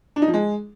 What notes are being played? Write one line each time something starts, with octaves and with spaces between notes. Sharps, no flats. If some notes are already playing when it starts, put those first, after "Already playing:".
D4
D#4
F3
G#3